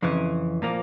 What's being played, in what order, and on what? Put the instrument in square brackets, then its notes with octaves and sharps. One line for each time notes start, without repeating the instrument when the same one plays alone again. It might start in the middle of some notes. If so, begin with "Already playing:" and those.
[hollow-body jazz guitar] F2 C#3 E3
A#2 F3 A#3